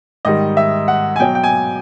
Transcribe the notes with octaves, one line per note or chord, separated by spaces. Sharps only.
G#2 D#3 G3 D#5
E5
F#5
G#5
B2 F#3 G5
G5
G#5